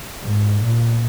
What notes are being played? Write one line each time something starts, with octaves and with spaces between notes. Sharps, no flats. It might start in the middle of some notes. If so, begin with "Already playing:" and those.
G#2
A#2